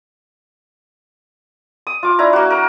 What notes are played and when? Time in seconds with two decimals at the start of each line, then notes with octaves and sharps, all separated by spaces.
1.87 D#6
2.03 F4 D6
2.19 D4 E4 A#5
2.33 A#3 F#4
2.50 A#4